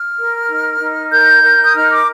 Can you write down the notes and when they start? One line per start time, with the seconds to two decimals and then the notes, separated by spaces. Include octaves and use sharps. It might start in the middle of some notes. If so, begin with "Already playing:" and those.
Already playing: F6
0.18 A#4
0.49 D#4
0.80 D#4
1.11 A#4 G6
1.43 A#4
1.66 D#6
1.75 D#4 F6
1.90 D6